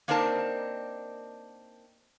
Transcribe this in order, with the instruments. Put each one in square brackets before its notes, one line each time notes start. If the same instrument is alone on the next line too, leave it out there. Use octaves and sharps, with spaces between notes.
[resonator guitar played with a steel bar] A#3 C4 D4 D#4 A#4 A5